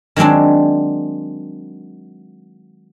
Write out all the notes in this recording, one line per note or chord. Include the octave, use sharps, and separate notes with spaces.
D#3 F#3 G#3 C4 D4